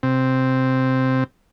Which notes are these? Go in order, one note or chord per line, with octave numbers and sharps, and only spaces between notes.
C3 C4